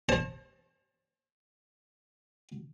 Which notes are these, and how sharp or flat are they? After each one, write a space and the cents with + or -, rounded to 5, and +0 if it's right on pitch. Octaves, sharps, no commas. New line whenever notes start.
C5 +45 A5 +0